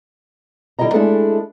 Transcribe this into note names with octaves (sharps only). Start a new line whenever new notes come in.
D3 G3 E4 G#4 D#5 A#5
G#3 A3 D4 E4 G#4 A4